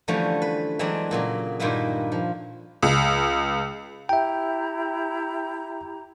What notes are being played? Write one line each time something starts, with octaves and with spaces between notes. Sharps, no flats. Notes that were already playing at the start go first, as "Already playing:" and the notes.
D3 E3 F3 G3 A3 C#4
B4
E3 F#3 G#3 C4 D4
A#2 C#3 F#3
G2 A#2 D#3 A#3 E4 B4
F3
C#2
E4 G4 E5 G5 A#5